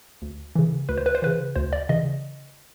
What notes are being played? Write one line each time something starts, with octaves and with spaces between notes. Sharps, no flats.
D2
C#3 E3
D2 B4
C5
B4
C5
C#3 E3 B4
D2 C5
D5
C#3 E3 D#5